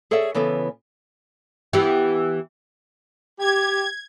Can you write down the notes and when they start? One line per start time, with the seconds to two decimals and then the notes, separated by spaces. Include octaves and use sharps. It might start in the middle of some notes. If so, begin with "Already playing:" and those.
0.11 G#4 A4 C#5 D5 E5
0.35 C#3 E3 B3 A4
1.73 E3 B3 G4
3.39 G4 G#6